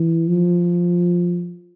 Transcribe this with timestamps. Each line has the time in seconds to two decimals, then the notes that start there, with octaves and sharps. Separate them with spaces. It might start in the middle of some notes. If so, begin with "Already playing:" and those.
Already playing: E3
0.28 F3